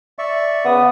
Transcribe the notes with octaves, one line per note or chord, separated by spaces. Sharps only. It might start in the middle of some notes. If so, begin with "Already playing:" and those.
D5 E5 C#6
C#3 B3 D#6